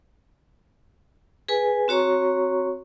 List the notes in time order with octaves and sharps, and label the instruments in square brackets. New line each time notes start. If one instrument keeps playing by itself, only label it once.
[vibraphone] G#4 B4 G#5
C4 F#4 C#5 A#5 C#6